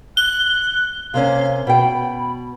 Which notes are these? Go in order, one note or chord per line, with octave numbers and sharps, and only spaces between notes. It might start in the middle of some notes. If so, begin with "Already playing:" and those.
F#6 G7
C3 A#3 C#4 F5
B2 G5 B5